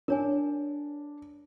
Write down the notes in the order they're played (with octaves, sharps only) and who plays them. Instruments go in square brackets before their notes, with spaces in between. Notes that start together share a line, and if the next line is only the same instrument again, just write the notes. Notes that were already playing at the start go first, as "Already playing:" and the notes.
[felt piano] D4 [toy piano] A#4 C#5 G#5